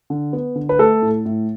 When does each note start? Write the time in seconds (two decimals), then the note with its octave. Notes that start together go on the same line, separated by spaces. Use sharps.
0.10 D3
0.33 B3
0.55 D3
0.69 B4
0.79 A3 A4
1.02 A2
1.26 A2